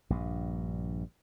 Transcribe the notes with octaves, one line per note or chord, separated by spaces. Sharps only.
A#1 G2